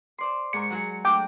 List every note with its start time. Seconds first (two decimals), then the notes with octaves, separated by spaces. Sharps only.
0.18 C5 D5 C6
0.53 G#2 A#4 C#6 C#7
0.70 F#3 F#4 G#4
1.05 A3 D4 F#4 G5 D6